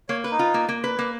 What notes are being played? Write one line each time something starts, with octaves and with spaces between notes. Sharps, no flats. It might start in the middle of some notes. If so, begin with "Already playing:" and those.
A#3 C#5
B4
D#4
F4
A#3
A#3
B4
A#3